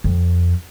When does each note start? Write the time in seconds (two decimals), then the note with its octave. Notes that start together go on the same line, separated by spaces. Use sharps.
0.04 F2